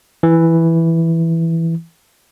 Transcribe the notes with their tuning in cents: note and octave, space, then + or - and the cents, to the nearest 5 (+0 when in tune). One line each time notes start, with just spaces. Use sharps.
E3 +0